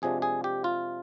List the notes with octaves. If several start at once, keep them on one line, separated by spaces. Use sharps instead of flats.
F2 C3 F3 G#3 D4 G#4
G#4
G4
F4